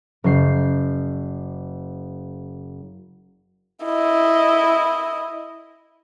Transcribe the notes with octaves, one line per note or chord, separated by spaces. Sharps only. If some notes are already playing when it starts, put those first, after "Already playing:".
F#1 F#3 G6 C7
E4 D#5